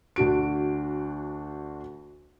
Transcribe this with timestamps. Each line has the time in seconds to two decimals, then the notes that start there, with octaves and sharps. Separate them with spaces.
0.16 D2 D4 F#4 D7